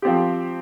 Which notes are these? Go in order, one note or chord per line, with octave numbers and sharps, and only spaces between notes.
F3 C4 G4